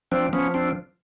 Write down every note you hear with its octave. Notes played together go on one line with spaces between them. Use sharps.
F3 C4 D4
F3 B3 C#4
C4 D4